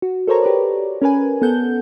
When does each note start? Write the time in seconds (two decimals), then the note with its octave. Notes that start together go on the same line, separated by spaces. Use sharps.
0.02 F#4
0.28 A4 A#4 C5 C#5 A#5
0.42 G4 B4 D5
1.02 C#4 A#4 B4 G#5
1.42 B3 A4 F#5 G6